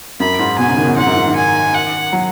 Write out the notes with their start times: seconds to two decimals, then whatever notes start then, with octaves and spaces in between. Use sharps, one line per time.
0.20 F#2 B5
0.39 G#2
0.59 B2 G#5
0.68 C#3
0.77 D#3
0.87 B2
0.97 G#2 F#5
1.06 F#2
1.16 G#2
1.27 D#3
1.36 G#5
1.74 F#5
2.13 F#3